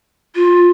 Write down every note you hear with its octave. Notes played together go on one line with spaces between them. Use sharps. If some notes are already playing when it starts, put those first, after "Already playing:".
F4